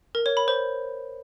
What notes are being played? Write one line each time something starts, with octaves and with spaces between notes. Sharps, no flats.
A#4
C#5
B5
C5